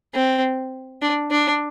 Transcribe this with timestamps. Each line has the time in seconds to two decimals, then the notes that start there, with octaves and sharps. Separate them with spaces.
0.14 C4
1.02 D4
1.31 D4